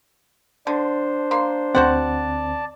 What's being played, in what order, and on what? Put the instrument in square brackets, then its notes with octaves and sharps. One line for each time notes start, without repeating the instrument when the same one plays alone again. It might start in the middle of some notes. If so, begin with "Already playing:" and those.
[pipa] D3 [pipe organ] D4 C5
[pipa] A#3 C6
[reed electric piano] D2 D3 C4 [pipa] F#4 C5 F#5 [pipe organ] D5 A5